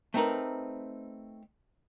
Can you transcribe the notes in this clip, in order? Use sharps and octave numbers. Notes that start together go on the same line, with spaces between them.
A3 C4 D#4 A#4 B4